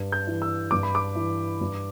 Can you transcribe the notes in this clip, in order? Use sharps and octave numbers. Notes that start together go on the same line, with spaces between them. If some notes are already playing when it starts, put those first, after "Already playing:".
Already playing: G2
G6
E3
E6
G2 D6
B5
D6
E3
G2